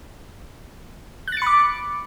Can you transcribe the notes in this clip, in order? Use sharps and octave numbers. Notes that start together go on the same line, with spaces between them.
B5 D6 F#6 A6 C#7